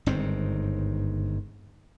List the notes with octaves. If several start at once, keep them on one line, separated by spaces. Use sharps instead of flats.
G1 G#2 D#3 C4